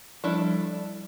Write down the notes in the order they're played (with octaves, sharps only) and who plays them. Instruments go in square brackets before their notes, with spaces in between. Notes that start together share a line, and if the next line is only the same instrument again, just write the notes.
[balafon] F3 G3 [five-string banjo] D4 E4 A4